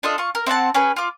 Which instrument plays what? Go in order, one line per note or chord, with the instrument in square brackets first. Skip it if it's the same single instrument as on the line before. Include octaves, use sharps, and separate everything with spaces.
[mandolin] D4 F4 A4 D#5
F4 C#6
A#4
C4 E5 F#5 A5
C#4 G#4 B4
F4 D6